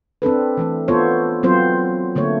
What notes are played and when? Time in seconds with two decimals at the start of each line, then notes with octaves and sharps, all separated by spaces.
0.22 C4 D4 A4 B4
0.57 E3 A3 C4
0.88 B3 F4 A4 C5 C#5
1.43 F#3 B3 C4 F4 C5
2.15 D3 A3 A#3 C#5